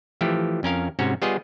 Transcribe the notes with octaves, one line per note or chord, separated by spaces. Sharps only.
E3 F3 A3 G4
F2 C#4 A#4 F5
G#2 C3 C#4 F#4 C#5
G3 B3 F4 G#4 C#5 D#5